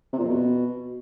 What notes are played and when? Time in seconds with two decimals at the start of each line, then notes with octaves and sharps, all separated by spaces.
0.13 C3
0.18 A#2
0.24 F2
0.29 B2